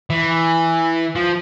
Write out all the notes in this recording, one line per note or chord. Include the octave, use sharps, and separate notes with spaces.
E3
F3